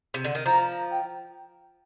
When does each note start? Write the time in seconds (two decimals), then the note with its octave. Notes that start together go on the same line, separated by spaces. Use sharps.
0.14 C3
0.25 D3
0.35 D#3
0.46 F3 A#5
0.91 G5